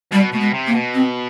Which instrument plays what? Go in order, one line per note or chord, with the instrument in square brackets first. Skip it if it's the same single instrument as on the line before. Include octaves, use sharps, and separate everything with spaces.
[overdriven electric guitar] B2 [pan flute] G3
[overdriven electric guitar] B2 [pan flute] A3
[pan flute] G#3
[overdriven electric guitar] C3
[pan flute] A#3
[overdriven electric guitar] B2
[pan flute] C4